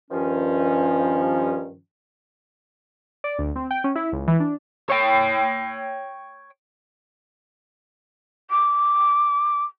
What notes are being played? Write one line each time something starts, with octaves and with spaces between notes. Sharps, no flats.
G2 D#3 F3 C#4
D5
D2
C4
G5
C#4
E4
C#2
E3
D4
C#5 G5
D6